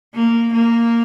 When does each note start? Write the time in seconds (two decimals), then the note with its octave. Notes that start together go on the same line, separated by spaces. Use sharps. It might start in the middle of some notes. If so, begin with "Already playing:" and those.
0.15 A#3
0.53 A#3